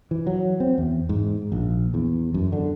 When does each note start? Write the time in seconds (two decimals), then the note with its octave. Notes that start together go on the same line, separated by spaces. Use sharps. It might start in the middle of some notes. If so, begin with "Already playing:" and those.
0.11 E3
0.27 F#3
0.60 C4
0.78 E2
1.09 G#2
1.52 A#1
1.94 E2
2.34 F#2
2.52 D3